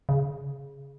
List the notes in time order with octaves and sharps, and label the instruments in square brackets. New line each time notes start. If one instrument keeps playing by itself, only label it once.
[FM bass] C#3